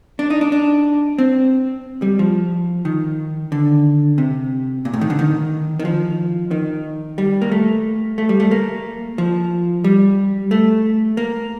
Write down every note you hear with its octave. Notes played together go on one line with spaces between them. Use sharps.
D4
D#4
D4
D4
C4
G3
F3
D#3
D3
C3
A#2
A2
D#3
D3
D#3
D#3
F3
D#3
G3
A#3
A3
A3
G3
A3
A#3
F3
G3
A3
A#3